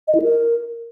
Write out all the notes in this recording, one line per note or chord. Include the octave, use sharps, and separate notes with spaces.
D#5
E4
A#4